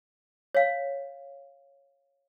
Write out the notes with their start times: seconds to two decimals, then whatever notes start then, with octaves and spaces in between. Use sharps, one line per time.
0.55 C#5 F5